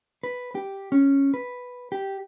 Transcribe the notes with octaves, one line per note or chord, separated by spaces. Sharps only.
B4
G4
C#4
B4
G4